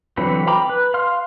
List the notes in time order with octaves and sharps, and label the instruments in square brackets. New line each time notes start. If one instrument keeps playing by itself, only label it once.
[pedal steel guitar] D3 E3 F#3 C4 B4
G5 A#5 B5 D6
B4
F5 C6 F6